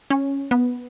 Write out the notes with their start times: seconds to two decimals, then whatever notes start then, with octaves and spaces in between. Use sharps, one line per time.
0.10 C#4
0.51 B3